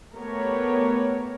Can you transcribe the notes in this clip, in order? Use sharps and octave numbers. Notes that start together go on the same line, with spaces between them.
A3 B3 G4 A#4 C#5